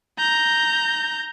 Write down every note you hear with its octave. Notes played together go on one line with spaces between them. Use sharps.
A#5 G6